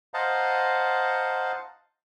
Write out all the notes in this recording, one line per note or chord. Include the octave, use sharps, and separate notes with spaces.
C5 D#5 F5 F#5 A5 A#5